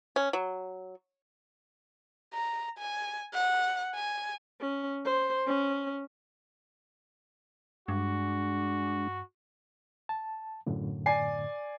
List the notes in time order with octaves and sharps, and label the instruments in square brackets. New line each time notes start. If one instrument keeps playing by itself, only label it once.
[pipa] C#4
F#3
[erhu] A#5
G#5
F#5
G#5
[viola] C#4
C5
C#4
[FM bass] G2 [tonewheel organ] G#3 D4 [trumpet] F#4
[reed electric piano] A5
F#2 A2 D3
[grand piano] D5 G#5 C7